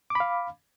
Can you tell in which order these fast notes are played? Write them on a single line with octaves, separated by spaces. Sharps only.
D6 B5 F5